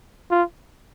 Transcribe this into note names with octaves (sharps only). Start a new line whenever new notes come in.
F4